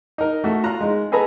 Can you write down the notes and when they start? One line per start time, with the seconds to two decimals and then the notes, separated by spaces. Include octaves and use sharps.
0.18 D#4 A#4
0.44 A3 F#4
0.64 F4 A#5 F#6
0.81 G#3 D#4
1.12 G#4 A4 B4 D#5 G#5 A#5